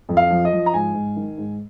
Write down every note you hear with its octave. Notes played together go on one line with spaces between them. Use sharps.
F2
F5
F3
D#5
F3
A#5
G#2 G#5
G#2
D#3
G#2